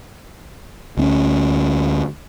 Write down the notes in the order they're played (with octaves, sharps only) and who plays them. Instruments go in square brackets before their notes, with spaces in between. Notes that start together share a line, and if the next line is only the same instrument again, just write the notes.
[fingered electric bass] D2 C4 C#4